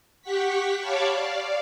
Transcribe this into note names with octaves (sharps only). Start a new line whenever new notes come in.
G4 F#5 C#6 B6
C#5 F5 A5 B5 C#6 D6
D5 F5